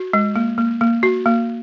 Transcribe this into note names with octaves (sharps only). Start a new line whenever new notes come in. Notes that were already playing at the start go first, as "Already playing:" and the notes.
Already playing: F#4
G#3
A#3
A#3
A#3
F#4
A#3